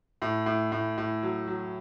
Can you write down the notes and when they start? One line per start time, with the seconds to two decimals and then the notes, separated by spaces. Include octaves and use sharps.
0.22 A2
0.46 A2
0.72 A2
0.98 A2
1.22 F#3
1.47 F#3